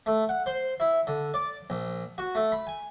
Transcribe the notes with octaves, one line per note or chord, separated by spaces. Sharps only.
A3
F#5
C5
E4
D3
D5
A#1
F#4
A3
B5
G#5